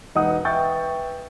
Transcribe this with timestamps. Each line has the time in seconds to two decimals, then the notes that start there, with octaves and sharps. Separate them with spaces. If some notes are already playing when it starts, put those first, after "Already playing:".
0.15 E1 D#4 B4 F#5 D#6
0.45 B4 E5 G5 C#6 G6 A6